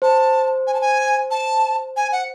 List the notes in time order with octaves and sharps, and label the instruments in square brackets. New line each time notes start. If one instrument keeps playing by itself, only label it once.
[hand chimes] C5 [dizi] A5
[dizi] G#5
A5
G#5
A5
G#5
F#5